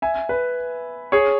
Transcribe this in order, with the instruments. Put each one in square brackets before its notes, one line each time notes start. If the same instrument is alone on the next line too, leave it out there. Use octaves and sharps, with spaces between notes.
[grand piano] E5 G#5
B4
G#4 C#5